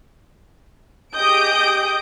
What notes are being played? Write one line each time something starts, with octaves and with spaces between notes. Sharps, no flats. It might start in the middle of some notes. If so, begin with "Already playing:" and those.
G4 G#4 D#5 D#6 G6 D7